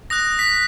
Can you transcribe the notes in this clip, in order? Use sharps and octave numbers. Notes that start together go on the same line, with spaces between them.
D#6 F#6 A#6
B6